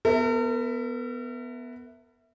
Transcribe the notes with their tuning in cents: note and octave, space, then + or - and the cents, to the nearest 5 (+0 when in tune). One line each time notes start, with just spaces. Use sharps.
B3 +0 A#4 -45 E5 +0